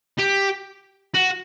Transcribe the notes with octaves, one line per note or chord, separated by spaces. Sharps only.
G4
F#4